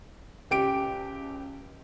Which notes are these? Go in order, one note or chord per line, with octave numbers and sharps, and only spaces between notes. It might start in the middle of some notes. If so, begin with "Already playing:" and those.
C#2 G4 D7